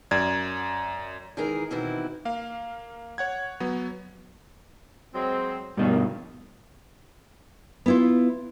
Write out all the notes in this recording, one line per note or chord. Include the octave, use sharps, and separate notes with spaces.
F#2 D5 G#6
D#3 E3 G#3 E4 G#4 A#4
B2 D#3 E3 C4 E4 F#4
A#3 F5
C#5 F#5 G#6
F#3 B3
F#3 G#3 C4
G2 B2 D#3
B3 E4 F4